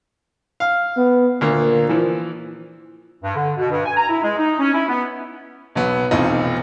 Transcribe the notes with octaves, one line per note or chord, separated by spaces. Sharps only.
F5
B3
D2 A#2 A#3
E3 F3
G2
D3
B2
G2
G#5
A#5
E4
G#3
D#4
C#4
E4
B3
B1 F#3 B3
F1 B1 E3 C4 D#4 F4